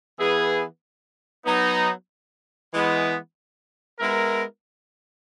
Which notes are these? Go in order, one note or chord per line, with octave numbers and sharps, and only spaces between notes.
E3 B3 E4 G#4
F#3 B3 D#4
E3 G#3 B3
G#3 B3 E4 A#4